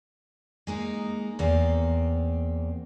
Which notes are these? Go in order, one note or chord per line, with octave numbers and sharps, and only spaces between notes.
G#3 A#3 D#4
E2 A#3 C4